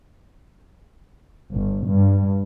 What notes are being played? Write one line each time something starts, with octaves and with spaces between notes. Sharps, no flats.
G1
G2